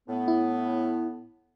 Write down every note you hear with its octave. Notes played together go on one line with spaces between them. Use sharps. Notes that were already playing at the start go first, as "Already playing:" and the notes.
A2 B3
E4